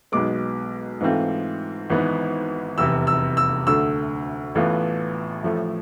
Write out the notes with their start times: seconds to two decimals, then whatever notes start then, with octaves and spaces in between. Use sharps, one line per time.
0.12 B1 B2 G#3 B3 D6
1.00 G#2 E3 A3 C4 F4
1.90 G#1 G#2 E3 B3
2.78 F1 E2 C3 E6
3.07 E6
3.37 E6
3.67 D2 D3 A3 E6
4.55 A1 A2 E3 B3 F4
5.43 A1 A2 F3 A3